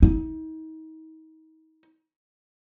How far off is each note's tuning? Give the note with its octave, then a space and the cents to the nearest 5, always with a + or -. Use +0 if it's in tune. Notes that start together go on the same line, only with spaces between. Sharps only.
D#4 +35